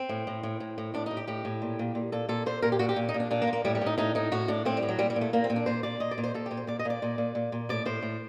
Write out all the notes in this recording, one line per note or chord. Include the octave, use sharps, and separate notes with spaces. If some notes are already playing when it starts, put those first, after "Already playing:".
Already playing: C4
A2
A2
A2
A2
A2
A2 D4
A2 D#4
G4
A2 G4
A2
A#2
A#2
A#2
A#2 A4
A#2 A4
A#2 C5
A#2 A#4
G4
A#2 F#4
G4
A#2
D#4
A#2
D4
A#2 D4
A#3
A#2
A#3
A2 G3
G3
A2 D#4
A2 D#4
A2 D#4
A2 F#4
A2 D4
A2 C4
G3
A2
F#3
A#2 G3
G3
A#2
A3
A#2 A#3
C4
A#2
D4
A#2 C5
A#2 D5
A#2 D#5
D5
A#2
C5
A#2 A4
A#2 G4
C5
A#2 D5
D#5
A#2 D5
A#2
A#2
A#2
A#2
A2 D5
A2 C5
A2